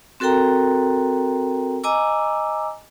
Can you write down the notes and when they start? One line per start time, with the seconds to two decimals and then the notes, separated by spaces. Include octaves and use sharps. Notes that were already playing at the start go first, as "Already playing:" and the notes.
0.20 C4 F#4 A4 A#4 G5 A#5
1.84 D#5 G#5 A#5 D6 E6